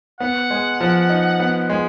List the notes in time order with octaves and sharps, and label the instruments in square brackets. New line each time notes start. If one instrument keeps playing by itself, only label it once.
[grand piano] B3 [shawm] F#5
[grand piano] G#3
F3
D#4
B3
G#3